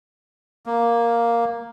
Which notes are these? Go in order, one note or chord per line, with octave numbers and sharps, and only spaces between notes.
A#3